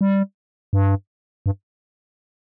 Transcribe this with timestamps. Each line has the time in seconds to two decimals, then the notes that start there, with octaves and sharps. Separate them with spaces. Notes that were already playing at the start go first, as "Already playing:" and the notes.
0.01 G3
0.73 G2
1.46 G2